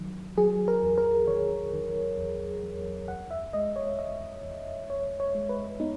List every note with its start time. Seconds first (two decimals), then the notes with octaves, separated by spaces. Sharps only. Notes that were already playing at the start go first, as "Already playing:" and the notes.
Already playing: D#3 F#3
0.37 F#3 G#4
0.68 A#4
0.83 E2
0.98 A#4
1.27 D#3 C#5
1.73 D#3
2.17 E2
2.64 E2
3.08 E2 F#5
3.31 E5
3.53 G#3 D#5
3.76 C#5
3.99 E2 D#5
4.44 E2
4.90 E2 C#5
5.20 C#5
5.35 G#3
5.49 B4
5.80 B3 D#4